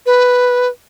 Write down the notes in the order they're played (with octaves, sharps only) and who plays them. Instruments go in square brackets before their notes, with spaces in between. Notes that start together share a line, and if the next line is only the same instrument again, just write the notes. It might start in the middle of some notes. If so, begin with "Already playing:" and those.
[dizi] B4